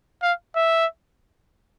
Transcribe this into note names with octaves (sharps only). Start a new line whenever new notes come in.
F5
E5